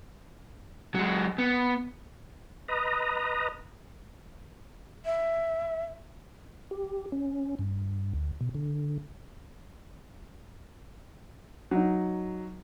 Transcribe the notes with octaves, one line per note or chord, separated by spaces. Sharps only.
F#3 G#3
B3
B4 D#5 A#5
E5
G4
C#4
G2
D2
B2
D3
F#3 D#4